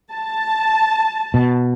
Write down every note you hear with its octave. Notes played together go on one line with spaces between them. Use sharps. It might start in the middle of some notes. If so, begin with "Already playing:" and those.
A5
B2